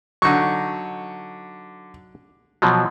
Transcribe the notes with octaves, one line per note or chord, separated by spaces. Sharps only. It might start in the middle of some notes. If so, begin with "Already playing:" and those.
D3 F#3 D#4 C#6
B2 F3 F#3